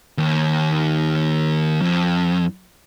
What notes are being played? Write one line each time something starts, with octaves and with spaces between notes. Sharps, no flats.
D#2
F2